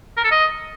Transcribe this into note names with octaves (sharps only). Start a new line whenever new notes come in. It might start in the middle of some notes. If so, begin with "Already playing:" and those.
A#4
A4
D#5